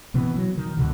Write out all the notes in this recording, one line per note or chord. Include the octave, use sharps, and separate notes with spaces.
B2 E3 B3
F#3
D#3
C#2 B2 D3